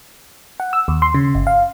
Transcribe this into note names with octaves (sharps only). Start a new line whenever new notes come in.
F#5
E6
D#2
C6
C#3
G1
F5